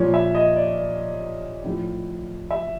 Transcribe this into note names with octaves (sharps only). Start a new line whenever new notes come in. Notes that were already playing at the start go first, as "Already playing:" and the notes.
Already playing: A#2 F3 C#5
E5
D#5
D5
D5
A2 F3
E5